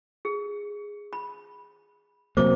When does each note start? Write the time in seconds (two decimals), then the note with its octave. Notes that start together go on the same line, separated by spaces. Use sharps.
0.25 G#4
1.13 B5
2.37 C3 F#3 A#3 C5 D6